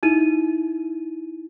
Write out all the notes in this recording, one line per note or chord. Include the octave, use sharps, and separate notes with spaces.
D#4 E4 D#7